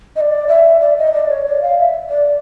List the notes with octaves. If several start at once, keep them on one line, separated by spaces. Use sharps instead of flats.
D#5
D5
E5
D5
D#5
D5
C#5
D5
F5
E5
D5